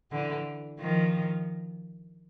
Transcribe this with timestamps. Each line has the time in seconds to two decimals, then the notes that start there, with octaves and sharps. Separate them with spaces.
0.11 D3 E3
0.79 D#3 F3